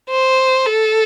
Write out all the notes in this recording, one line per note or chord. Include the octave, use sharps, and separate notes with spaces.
C5
A4